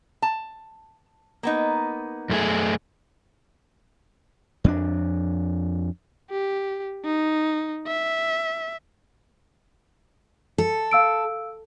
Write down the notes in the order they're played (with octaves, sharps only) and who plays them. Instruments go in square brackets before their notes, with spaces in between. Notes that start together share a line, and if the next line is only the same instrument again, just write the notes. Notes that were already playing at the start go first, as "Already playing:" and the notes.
[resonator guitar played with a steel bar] A5
A#3 B3 D#4
[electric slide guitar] F#2 A3 G#4
[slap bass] F2 C4 D4
[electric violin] G4
D#4
E5
[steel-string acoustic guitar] A4
[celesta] F5 E6 D7